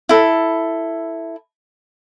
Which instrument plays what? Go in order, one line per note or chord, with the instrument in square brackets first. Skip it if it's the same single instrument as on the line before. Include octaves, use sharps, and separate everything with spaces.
[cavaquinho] E4 A4